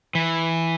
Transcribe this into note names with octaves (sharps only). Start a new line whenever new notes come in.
E3